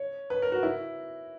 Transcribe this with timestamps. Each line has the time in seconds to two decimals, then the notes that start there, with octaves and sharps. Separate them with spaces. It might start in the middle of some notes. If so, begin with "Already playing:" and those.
Already playing: C#5
0.30 B4
0.42 A#4
0.52 F#4
0.63 E4